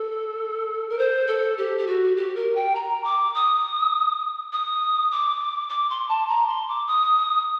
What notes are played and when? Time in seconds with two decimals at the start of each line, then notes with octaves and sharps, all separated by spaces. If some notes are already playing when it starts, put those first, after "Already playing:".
Already playing: A4
0.89 A#4
0.98 C5
1.27 A4
1.58 G4
1.78 G4
1.87 F#4
2.17 G4
2.36 A#4
2.55 G5
2.75 A#5
3.04 D6
3.35 D#6
4.53 D#6
5.11 D6
5.69 D6
5.90 C6
6.09 A5
6.28 A#5
6.48 C6
6.68 D6
6.87 D#6